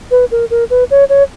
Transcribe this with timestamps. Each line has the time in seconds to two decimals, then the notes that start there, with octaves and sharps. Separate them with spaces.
0.11 B4
0.31 A#4
0.50 A#4
0.70 B4
0.91 C#5
1.09 C#5